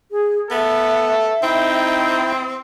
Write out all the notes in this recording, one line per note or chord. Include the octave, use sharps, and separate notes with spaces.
G#4
B3 A4 E5
C4 D#4 E4 G5